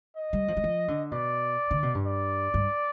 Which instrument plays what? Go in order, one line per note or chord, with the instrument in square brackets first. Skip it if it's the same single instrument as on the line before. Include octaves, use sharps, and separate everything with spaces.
[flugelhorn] D#5
[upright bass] G3
F3
G3
F3
D3
[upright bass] B2 [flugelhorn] D5
[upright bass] D3
B2
G2
[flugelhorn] D5
[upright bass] G2